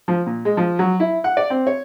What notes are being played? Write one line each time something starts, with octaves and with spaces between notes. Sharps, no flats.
F3
A#2
G#3
F3
F#3
E4
F#5
D5
C4
C#5